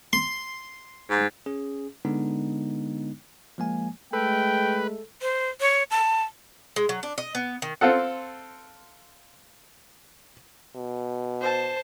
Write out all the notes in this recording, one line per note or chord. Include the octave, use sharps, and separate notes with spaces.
C6
G#2
C#4 G#4
D3 G#3 B3 D4 D#4
F3 G#3 A#3 G#5
G#3 A3 A4 B4 G5
C5
C#5
A5
G#3
F#3
D4
D#5
B3
D#3
C4 F4 A4 F#5
B2
C5 A5